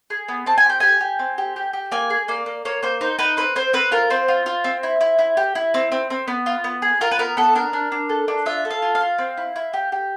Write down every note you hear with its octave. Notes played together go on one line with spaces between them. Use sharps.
G#4
B3
C4 A5
G#5
G4 G5
G4 G#5
G4
C4
G4
G4
G4
A#3 G#5
G#4
A#3 D5
A#3
A#3 C#5
A#3 C5
D#4 C5
D#4 B4
C4 B4
C4 C5
C4 B4
F4 A#4
C4 C5
F4
F4
C4
E4
E4
E4
G4
E4
C4
C4
C4
B3
F4
B3
G#4
F4 A#4
B4
B3 A#4
B3 A4
D4 A#4
D4
D4
A4
D4
F4 E5
A4
F5
F4
F5
F4
C4
E4
E4
G4
G4